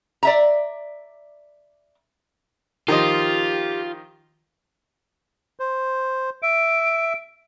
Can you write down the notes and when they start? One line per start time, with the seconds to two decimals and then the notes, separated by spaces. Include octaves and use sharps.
0.23 D5 E5 A#5
2.88 D#3 F3 F4 G4 D#5
5.60 C5
6.43 E5 D7